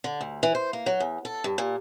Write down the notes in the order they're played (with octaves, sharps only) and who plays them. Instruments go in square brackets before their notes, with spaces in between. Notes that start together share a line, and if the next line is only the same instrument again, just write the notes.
[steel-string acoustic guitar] D3
D2
E3
C5
A#3
F#3
E2
A4
G2
A#2